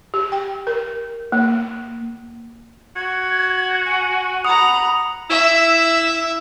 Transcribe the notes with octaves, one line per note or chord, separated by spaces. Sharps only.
G4
G5
A#4
A#3
F#4 G#6
G#5
F#5 A#5 B5 D#6
E4 E5